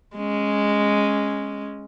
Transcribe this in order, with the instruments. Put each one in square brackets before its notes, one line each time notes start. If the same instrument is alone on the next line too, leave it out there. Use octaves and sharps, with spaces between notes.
[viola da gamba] G#3 C#4